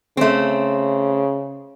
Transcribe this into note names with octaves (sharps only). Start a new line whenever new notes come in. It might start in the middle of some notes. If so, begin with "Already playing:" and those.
C#3 A3 C4